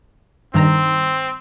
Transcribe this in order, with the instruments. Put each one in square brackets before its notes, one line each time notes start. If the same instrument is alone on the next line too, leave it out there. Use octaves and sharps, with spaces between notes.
[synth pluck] G2 D#3 A#5 [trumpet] C4